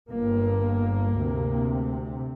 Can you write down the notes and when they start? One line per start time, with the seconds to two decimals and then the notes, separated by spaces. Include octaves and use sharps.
0.10 G1 G2 A#3
1.17 D2 C3